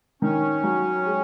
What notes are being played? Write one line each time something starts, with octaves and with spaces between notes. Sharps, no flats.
D#3 C#4
F#3
G#3